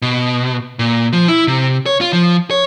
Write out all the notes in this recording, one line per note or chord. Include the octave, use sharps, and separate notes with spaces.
B2
A#2
F3
E4
C3
C#5
F4
F3
C#5